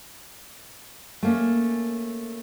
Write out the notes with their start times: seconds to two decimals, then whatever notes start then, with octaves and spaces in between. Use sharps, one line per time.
1.23 A3 A#3 C#4